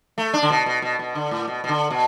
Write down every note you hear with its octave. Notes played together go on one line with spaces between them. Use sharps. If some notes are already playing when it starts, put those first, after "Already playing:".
A3
D4
D3
B2
B2
B2
B2
D3
A2
B2
B2
D3
B2